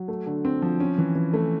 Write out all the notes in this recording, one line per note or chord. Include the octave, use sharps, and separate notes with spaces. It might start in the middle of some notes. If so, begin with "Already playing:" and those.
Already playing: F#3
A3
D3
C4
F3
C#4
E3
E3
A3